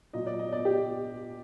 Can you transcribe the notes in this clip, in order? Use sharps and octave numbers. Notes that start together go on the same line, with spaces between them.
A#2 F#3 D#5
D5
D#5
D5
G4